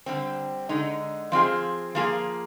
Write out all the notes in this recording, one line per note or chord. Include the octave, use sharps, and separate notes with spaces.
D3 G3 C4
D3 G#3 D#4
F3 C4 F4 G#4
F3 A#3 F4 G#4